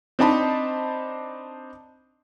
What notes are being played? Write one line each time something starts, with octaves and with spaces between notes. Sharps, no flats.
C4 D4 D#4 C5 A5 B5